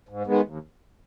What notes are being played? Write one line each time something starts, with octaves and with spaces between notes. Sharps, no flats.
G#2
D#3 G#3 B3
D#2